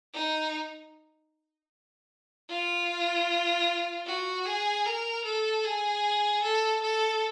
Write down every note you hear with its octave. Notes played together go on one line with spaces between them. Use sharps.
D#4
F4
F#4
G#4
A#4
A4
G#4
A4
A4